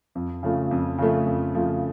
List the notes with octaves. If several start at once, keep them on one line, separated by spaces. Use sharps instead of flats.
F2
C#3 F3 A3
F2
C#3 F3 A3
F2
C#3 F3 A3